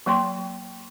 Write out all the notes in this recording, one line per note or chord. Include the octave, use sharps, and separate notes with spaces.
F#3 A#3 G5 C6